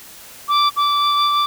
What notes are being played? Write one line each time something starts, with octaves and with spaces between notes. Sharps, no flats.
D6
D6